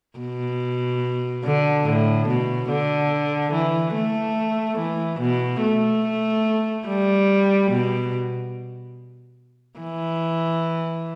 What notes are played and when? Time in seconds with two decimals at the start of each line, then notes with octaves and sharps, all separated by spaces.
0.19 B2
1.44 D3
1.85 A2
2.28 B2
2.69 D3
3.53 E3
3.95 A3
4.78 E3
5.20 B2
5.63 A3
6.88 G3
7.71 B2
9.80 E3